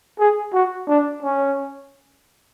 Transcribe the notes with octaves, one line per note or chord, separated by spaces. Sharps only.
G#4
F#4
D4
C#4